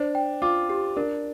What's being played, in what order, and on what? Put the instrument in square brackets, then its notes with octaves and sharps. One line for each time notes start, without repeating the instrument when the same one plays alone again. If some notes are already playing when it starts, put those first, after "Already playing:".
Already playing: [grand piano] D4 [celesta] C5
[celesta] G5
[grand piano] F4 [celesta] D6
[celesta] G4
[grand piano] D4 [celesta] A#4